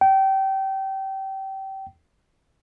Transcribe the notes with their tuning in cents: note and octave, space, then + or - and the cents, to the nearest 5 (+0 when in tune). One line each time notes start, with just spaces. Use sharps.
G5 -25